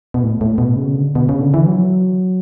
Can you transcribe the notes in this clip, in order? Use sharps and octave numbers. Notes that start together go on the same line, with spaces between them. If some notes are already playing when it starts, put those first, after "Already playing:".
B2
A2
A2
B2
C#3
D3
B2
C#3
D3
E3
F#3